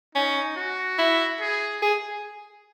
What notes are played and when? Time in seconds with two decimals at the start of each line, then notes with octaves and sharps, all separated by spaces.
0.15 C#4 D#4
0.56 F#4
0.99 E4
1.40 G#4
1.82 G#4